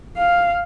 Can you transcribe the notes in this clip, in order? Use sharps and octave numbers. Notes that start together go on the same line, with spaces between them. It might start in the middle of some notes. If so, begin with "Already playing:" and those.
F5